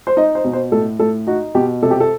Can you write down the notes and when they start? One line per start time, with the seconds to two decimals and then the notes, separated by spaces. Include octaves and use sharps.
0.07 C5
0.17 D#4 D#5
0.35 C5
0.44 B2
0.53 C5
0.72 A2 A4
0.99 A2 A4
1.27 D#4 F#4
1.55 B2 G4
1.83 C3 A4
1.91 G4
2.00 A4